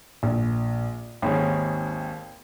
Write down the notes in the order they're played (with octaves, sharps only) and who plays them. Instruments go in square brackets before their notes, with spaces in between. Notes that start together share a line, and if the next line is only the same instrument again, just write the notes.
[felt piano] A#1
[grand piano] G#1 C#4 G#4 [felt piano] D#2